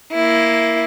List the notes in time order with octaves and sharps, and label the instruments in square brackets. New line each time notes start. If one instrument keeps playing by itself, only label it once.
[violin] A#3 E4